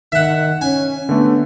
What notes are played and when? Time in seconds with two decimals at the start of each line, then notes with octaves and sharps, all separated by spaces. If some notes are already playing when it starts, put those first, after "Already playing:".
0.12 D#3 E5 F#5
0.61 C#4 G#5
1.09 D3 A3 B3